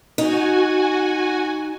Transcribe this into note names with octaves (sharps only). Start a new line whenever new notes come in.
D#4 F#4 G#5